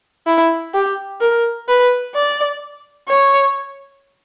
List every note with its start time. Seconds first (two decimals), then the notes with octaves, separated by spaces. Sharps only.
0.27 E4
0.74 G4
1.21 A#4
1.68 B4
2.15 D5
3.09 C#5